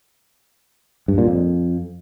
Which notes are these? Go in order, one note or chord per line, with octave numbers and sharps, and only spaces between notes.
G2
A#2
F2